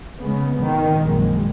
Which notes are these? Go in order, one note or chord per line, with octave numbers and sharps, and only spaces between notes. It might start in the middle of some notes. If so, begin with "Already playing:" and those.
C#3 G#3 B3
G#1 D#3
A#1 F#2 G#3